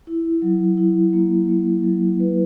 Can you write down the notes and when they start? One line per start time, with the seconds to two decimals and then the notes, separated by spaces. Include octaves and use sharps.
0.07 E4
0.42 F#3
0.77 E4
1.13 A#3
1.49 A#3
1.84 F#3
2.20 B4